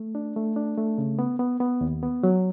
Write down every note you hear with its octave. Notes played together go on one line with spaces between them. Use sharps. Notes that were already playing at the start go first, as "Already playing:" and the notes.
Already playing: A3
D4
A3
D4
A3
C#3
B3
B3
B3
D#2
B3
F#3